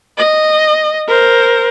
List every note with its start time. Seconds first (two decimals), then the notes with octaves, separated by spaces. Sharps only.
0.17 D#5
1.08 A#4 C5